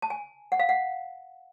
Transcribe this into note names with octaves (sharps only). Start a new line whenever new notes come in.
A5
G#5
F#5
F5
F#5